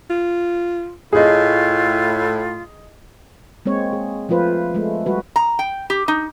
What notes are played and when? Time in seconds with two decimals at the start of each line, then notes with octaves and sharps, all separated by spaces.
0.10 F4
1.13 A2 F4 G#4 D#5
3.66 G#3 A#3 C4 C#5
3.93 G#4
4.29 F3 A3 F4 B4 C5
4.75 G#3 A3
5.06 G3 F#4 B4
5.36 A#5
5.59 G5
5.90 G4
6.08 D#4